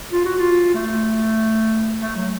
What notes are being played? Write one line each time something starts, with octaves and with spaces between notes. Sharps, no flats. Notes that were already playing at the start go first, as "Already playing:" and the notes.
F4
F#4
F4
A3
A3
F#3